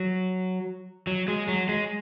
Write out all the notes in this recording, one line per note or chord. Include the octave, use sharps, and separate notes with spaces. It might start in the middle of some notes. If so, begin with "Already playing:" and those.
Already playing: F#3
F#3
G#3
F#3
G#3